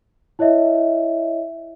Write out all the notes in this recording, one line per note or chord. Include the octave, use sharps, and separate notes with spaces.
E4 C#5 D#5 E5